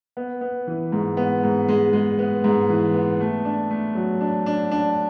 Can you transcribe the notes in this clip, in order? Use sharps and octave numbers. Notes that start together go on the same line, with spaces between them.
B3
B3
E3
G#2
B3
G#2
G#3
G#3
B3
G#2
E3
B3
A3
D4
A3
F#3
D4
D4
D4